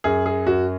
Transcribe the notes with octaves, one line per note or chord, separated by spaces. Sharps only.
F#2 G#4
G#4
F#2 F#4